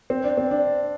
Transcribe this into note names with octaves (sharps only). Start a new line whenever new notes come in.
C4
D4
C4
D4